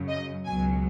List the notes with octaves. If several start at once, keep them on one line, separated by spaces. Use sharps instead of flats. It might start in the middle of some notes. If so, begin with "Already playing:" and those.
Already playing: F#2 C#3 F#3
D#5
C#2 B2 F#3 G#5